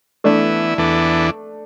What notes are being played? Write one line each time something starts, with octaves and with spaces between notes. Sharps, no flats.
E3 A3 B3 D4 E4
E2 E3 B3 D4 A4